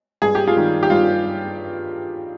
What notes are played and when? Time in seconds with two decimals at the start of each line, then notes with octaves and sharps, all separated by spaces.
0.22 G2 G#4
0.35 G4
0.47 F4 G#4
0.56 D#3 G3
0.83 G4
0.90 G2 F4